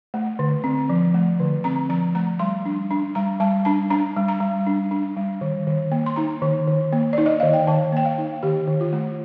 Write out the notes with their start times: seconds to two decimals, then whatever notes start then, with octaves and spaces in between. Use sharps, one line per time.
0.14 A3
0.39 D3
0.64 C4
0.89 F3
1.14 A3
1.40 D3
1.64 C4 A#5
1.89 F3 A#5
2.15 A3 A#5
2.39 G3 C6
2.65 D4
2.91 D4
3.15 G3 A#5
3.40 G3 A5
3.65 D4 A5
3.90 D4 A#5
4.16 G3
4.28 A#5
4.40 G3
4.67 D4
4.91 D4
5.17 G3
5.41 D#3
5.67 D#3
5.92 A#3
6.06 C6
6.16 D#4 A#5
6.42 D#3
6.67 D#3
6.93 A#3
7.13 D#4 D5
7.26 D#5
7.40 D#3 F5
7.53 G5
7.67 D#3 A5
7.92 A#3 G5
8.05 F5
8.18 D#4
8.43 D#3 G4
8.68 D#3
8.81 F4
8.93 A3